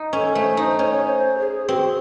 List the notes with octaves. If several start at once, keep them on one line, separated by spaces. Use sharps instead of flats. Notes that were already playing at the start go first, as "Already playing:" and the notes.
Already playing: D#4
C#4 A4
A3 C5
D#4 C5
C#4 C#5
C#5
C5
G#4
C4 F#4